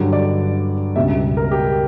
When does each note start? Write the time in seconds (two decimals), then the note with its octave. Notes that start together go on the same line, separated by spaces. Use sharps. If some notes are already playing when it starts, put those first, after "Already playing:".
Already playing: G2 D3 F#3
0.13 D5
0.96 C#2 B2 G3 E5
1.37 A#4
1.51 G4